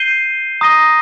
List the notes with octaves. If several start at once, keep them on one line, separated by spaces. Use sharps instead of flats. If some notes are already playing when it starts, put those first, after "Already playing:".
Already playing: G6 C7 D#7 G7
A#5 D#6 A#6 D#7 G7